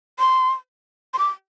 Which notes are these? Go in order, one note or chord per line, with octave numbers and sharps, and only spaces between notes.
C6
C6
D6